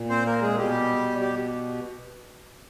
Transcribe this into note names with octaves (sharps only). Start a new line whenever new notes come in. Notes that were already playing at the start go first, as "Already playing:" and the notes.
Already playing: A#2
C4 C5
A#3 A#4
G#3 G#4
B2 G3 G4
G3 G4